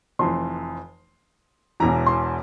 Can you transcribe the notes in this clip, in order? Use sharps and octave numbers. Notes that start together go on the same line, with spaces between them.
F1 F2 E3 C6
E1 E2 E3 A#5
C6